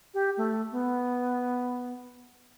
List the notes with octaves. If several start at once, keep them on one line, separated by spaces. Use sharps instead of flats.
G4
A3
B3